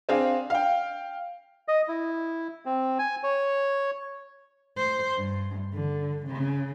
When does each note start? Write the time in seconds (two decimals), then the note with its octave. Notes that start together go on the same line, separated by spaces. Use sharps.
0.09 C4 D4 G#4 F5
0.50 F5 G5
1.68 D#5
1.88 E4
2.66 C4
2.99 G#5
3.23 C#5
4.77 C5
5.17 G2
5.73 D3
6.26 C#3